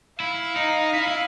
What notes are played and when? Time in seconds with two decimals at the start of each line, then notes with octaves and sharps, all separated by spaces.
0.19 E4 F5
0.56 D#4
0.94 E4
1.08 E4